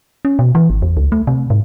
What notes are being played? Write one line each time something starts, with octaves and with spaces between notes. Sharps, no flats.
C#4
B2
E3
G#1
E2
C#2
A3
C3
G#2